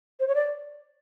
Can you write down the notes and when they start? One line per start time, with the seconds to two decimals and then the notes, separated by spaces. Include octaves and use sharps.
0.20 C5
0.28 C#5
0.35 D5